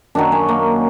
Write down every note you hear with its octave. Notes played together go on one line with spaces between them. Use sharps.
F#2 D#3 F#3 D4
C#4
A#3